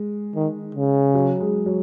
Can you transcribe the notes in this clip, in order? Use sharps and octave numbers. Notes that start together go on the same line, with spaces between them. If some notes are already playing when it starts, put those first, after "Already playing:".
Already playing: G#3
D#3
C#3
F#3
G#3
F#3